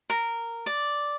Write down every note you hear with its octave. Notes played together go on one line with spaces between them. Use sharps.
A#4
D5